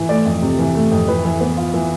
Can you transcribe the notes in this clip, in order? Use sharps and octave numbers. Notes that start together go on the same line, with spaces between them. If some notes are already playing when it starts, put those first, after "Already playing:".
Already playing: E3
A3 D5
F2
C3
E3
A3
F2
E3 B4
E3
B3
F4
E3